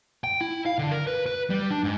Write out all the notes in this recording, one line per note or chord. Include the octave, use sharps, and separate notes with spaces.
G5
E4
F5
D3
A#4
B4
B4
G3
D4
G#2